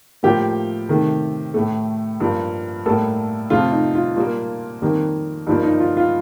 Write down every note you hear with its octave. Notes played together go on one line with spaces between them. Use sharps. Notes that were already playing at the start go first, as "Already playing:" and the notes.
A2 F3 A#3 G4
C3 D#3 A3
A2 A3
G2 F3 A#3
A2 G3 A#3 A4
F2 C3 F3 A3 F4
D#4
F4
A#2 G3 A#3 F4
F2 D#3 G3 A#3
G2 F3 A#3 D#4
D#4
F4
F4